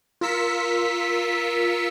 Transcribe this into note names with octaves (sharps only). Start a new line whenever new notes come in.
F4 A#4 E6 B6 C#7